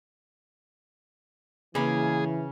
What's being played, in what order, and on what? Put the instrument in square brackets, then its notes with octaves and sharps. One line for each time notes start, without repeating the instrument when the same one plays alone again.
[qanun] C#3 D6 [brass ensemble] E3 [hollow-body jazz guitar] A#3 B5 [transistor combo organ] G#4